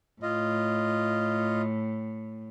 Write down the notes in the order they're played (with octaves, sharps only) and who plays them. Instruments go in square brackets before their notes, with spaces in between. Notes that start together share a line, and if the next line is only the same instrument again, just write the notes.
[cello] A2 [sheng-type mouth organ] F4 D#5